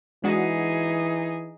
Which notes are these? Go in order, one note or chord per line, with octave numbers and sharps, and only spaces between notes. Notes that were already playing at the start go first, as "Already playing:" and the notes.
E3 G#3 D4 D#4 F#4 G#4